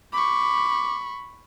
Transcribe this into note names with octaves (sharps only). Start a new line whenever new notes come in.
B5 C#6 D6